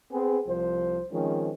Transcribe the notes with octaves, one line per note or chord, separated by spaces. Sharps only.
B3 C4 G#4
C2 F3 C5
D#3 F3 G#3 C4 C#4